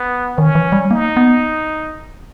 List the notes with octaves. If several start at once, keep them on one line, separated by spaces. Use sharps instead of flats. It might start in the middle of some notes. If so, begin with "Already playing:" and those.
Already playing: B3
D#3 C#4
E3
G3
A#3 D#4
B3